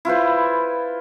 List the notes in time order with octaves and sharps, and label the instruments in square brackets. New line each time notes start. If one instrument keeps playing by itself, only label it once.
[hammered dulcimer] E4 F4 B4 C5